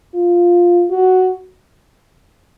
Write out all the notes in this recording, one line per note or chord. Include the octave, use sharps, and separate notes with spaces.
F4
F#4